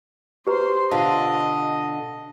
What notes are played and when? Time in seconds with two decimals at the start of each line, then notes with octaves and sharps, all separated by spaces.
0.47 G4 B4 C5 A#5 C6
0.91 B2 D3 F4 D#5 F5 A5